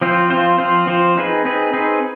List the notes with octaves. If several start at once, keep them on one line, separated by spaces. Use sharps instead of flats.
F3 C4 F4 C5
F3 C4 F4 C5
F3 C4 F4 C5
F3 C4 F4 C5
C4 D#4 G#4 B4
C4 D#4 G#4 B4
C4 D#4 G#4 B4